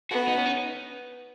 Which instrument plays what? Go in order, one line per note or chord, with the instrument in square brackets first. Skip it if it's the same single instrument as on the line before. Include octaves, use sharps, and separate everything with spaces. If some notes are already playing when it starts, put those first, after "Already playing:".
[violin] B3 [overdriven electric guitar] F#4
[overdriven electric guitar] D#4
C#4
D#4